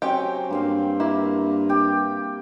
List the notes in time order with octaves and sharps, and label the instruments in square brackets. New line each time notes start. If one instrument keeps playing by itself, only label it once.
[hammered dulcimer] F#3 C4 [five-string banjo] C#4 G4 G5
[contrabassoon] G2 [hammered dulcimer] A#3 C4 F5
[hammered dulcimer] A#3 [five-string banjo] E4
[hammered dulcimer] G4 G5